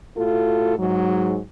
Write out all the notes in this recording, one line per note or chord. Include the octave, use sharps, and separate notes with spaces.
A2 F4 F#4 A4
G#2 F#3